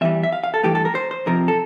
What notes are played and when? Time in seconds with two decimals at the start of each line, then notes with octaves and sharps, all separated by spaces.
0.01 E2 E3 G3 E5
0.23 E5
0.33 F5
0.44 F5
0.54 A4
0.63 G2 E3 A3 G4
0.75 A4
0.85 A#4
0.95 C5
1.11 C5
1.26 F2 C3 F3 A#4
1.48 A4